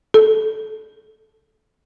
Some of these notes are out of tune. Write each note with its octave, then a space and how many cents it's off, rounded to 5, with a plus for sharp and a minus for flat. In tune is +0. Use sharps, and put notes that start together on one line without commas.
A4 -15